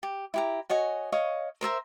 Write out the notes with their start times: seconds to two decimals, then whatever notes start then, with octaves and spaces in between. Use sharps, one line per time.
0.03 G4
0.34 E4 G4 A#5
0.70 F#4 C#5 D#5 G#5
1.12 C#5 D#5 F5 C#6
1.61 A#4 C5 E5 A#5